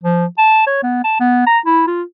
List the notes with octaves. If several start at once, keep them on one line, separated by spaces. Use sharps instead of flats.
F3
A5
C#5
B3
A5
B3
A#5
E4
F4